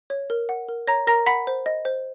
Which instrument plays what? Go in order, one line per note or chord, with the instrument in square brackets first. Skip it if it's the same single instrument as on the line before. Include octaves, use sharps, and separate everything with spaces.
[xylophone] C#5
A#4
F#5
A#4
C#5 A#5 A#6
A#4 A#5 A#6
F#5 B5 B6
C5
D#5
C5